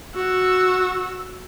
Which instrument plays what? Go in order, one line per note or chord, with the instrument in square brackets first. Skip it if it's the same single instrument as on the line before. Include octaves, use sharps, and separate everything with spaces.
[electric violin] F#4 E6